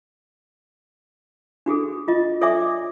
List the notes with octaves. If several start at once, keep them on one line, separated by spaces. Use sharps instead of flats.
D4 F#4 G#4 A4
F4 D#5
A4 C#5 D5 E5 G#5 D6